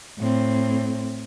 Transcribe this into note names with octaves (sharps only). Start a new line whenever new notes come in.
A2 C4